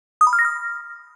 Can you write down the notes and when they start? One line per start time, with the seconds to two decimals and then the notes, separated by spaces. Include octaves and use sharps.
0.21 D#6
0.27 B5
0.33 F6
0.39 A#6
0.45 F6